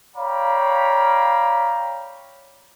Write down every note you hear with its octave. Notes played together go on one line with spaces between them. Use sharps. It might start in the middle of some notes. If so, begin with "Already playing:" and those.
C#5 D5 F5 G5 A#5 B5